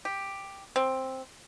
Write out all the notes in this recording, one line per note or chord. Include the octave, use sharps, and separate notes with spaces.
G4
C4